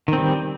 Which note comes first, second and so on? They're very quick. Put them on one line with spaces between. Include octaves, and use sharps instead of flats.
D#3 C4 G3